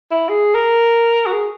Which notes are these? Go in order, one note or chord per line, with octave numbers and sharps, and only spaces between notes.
E4
G#4
A#4
F#4
G#4